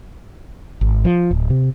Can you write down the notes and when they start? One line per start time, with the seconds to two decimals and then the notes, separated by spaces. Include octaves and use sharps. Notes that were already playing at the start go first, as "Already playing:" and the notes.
0.81 G#1
1.05 F3
1.31 D1
1.50 C3